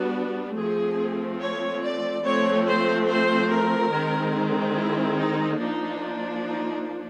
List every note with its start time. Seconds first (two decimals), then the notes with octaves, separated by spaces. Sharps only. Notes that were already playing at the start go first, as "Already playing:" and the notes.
Already playing: G3 B3 D4 F#4
0.57 F3 A3 C4 G#4
1.41 C#5
1.83 D5
2.25 F3 A3 C4 C#5
2.67 C5
3.08 C5
3.50 A#4
3.91 D#3 G#3 C4
4.76 E4
5.17 D#4
5.59 F3 A#3 D4 D#4
6.43 D#4